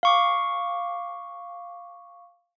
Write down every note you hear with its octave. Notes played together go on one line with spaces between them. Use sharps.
F5 C#6 D6